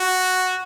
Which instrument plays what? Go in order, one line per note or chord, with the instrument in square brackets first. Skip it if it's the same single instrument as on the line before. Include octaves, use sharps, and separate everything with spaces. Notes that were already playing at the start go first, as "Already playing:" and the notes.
Already playing: [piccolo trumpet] F#4